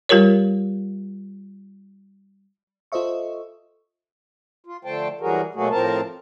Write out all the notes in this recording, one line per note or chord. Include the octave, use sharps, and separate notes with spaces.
G3 F4 G4 A#4 C#5
F4 A4 C5 D#5 E5 C#6
F4
D3 F3 A3 C5 G5 A5
E3 F#3 G3 F#4 G#4 A#4
B2 F#3 A3 A#3 F#4 G#4
A2 F3 C4 A#4 A5